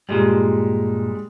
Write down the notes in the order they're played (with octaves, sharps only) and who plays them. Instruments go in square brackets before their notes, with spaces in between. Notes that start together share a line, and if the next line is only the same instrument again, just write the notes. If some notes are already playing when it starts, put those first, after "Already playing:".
[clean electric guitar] G2 A#2 [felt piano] G3 G#3